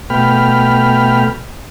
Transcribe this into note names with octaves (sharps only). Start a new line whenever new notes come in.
B2 A3 G5 B5 F6